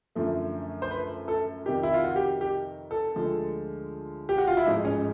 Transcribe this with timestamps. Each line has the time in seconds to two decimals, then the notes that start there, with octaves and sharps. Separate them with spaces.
0.15 F#2 D3 F3 A3
0.82 C5
0.91 B4
1.28 A4
1.66 F2 C3 D#3 G4
1.83 E4
1.94 F4
2.05 F#4
2.16 G4
2.41 G4
2.91 A4
3.16 D2 D3 F3 G#3
4.29 G4
4.38 F#4
4.47 F4
4.57 E4
4.66 A1 G#2 F3 G#3 D#4
4.85 C#4